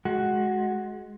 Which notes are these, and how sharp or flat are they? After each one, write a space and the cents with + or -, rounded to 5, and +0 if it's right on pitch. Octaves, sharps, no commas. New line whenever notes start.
G#3 +20 F#4 +0